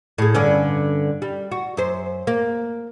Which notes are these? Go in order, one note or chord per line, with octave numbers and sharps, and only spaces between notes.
A2 G#4
G2 D3 C#4
G3
F#4
F#2 C5
A#3